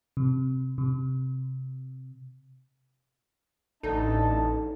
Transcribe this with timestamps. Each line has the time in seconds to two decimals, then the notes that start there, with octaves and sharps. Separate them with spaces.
0.17 C3
0.78 C3
3.83 A1 D3 D4 D#4 A4 D#5 A5